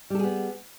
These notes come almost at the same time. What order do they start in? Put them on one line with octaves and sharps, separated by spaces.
G3 A4 G#4 B3